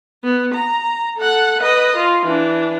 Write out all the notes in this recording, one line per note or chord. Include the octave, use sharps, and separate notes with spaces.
B3
A#5
A4 F#5
B4 D#5
F4
E3 D4